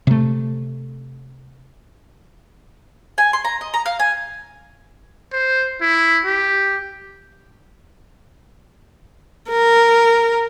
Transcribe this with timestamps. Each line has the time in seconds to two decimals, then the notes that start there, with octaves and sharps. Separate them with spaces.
0.07 C3 A3
3.18 G#5
3.33 C6
3.45 A#5
3.61 D#5
3.74 A#5
3.86 F5
4.00 G#5
5.33 C5
5.81 E4
6.25 G4
9.50 A#4